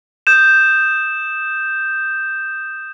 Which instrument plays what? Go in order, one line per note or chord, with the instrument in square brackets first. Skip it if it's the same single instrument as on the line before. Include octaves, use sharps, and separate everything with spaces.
[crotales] D#6 G6 E7